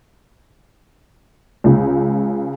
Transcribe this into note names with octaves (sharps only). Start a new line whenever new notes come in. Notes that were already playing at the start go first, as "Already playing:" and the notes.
C#2 C#3